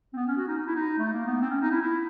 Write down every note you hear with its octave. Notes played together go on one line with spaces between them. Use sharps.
C4
B3
C#4
F#4
D#4
D#4
E4
D#4
A3
A#3
B3
C4
C#4
D#4
E4
E4